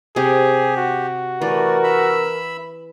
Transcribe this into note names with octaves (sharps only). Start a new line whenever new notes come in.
C3 G4 G#4
F#4
E3 A3 A#4 D5
E5 B5 E6